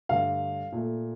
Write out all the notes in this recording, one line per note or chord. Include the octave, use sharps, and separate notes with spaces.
G2 D3 A3 F5
A#2 A3